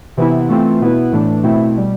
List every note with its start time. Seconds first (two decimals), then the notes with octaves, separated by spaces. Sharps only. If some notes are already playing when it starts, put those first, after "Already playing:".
0.17 C3 E3 B3 E4
0.49 E3 A3 C4 F4
0.81 B2 B3 E4 B4
1.12 A2 E3 A3 D4
1.43 B2 A3 C4 E4
1.76 B2 G3